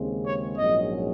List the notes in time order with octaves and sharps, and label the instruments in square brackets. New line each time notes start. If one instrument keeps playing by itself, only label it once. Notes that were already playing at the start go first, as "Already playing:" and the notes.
Already playing: [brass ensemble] D#2 C#3 G#3 C4
C#5
A#1 G#2 F#3 C#4 D#5